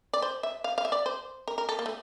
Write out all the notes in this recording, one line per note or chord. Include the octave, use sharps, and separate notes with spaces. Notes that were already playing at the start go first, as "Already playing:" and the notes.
D5
C5
E5
F5
F5
E5
D5
C5
A#4
A#4
A4
A#3
A3